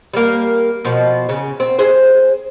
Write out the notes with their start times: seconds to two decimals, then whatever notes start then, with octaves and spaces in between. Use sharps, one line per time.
0.14 G3 A#3
0.85 B2 F3
1.29 C#3
1.60 C4
1.79 G#4 C5